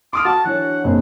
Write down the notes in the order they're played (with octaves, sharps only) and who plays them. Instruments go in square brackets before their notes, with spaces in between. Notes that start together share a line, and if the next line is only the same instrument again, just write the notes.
[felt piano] C6 D#6 F6 [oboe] D6
[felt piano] F#4 [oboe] A5
[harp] E3 D4 C#5 [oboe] F#5
[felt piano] F#1 [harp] C4 G#4